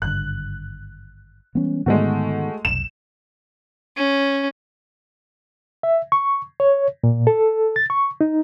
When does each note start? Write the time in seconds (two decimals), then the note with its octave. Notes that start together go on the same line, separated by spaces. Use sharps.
0.02 G#1 G2 D3 F#6
1.55 E3 G3 G#3 B3 C#4
1.86 G#2 D3 D#3 G#3 A3 B3 F#4
2.65 F1 B1 E7
3.97 C#4
5.83 E5
6.12 C#6
6.60 C#5
7.04 A#2
7.27 A4
7.76 A6
7.90 C#6
8.21 D#4